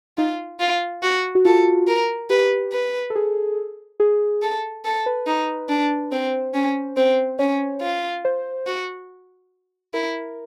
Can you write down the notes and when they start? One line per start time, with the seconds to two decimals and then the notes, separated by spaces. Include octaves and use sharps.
0.18 D#4 F4
0.60 F4
1.03 F#4
1.35 F#4
1.45 F4 A4
1.87 A#4
2.30 G4 B4
2.72 B4
3.10 A4
3.15 G#4
4.00 G#4
4.42 A4
4.85 A4
5.06 B4
5.27 D#4
5.69 D4
6.12 C4 C5
6.54 C#4
6.97 C4 C5
7.39 C#4 C#5
7.82 F4
8.25 C5
8.66 F#4
9.94 E4 A#4